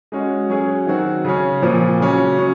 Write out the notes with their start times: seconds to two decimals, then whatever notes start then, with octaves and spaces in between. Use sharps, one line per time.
0.12 G#3 C#4 F#4
0.50 F#3 C#4 G#4
0.87 D#3 F#3 C4 F#4
1.25 C#3 F#3 C#4
1.62 A#2 F3 C4
2.00 C#3 F#3 C#4
2.37 F#3 C#4